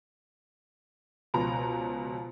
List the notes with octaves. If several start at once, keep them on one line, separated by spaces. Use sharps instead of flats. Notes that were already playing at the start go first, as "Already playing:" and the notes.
C#2 B2 F3 A#5